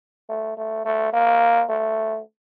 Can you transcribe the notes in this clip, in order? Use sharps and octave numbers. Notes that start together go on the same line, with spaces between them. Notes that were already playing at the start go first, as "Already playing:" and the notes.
A3
A3
A3
A#3
A3